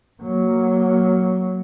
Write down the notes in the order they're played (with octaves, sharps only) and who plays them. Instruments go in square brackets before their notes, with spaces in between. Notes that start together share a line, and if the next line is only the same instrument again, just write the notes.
[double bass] F#3 A#3